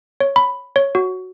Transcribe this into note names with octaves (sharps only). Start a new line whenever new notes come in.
C#5
B5
C#5
F#4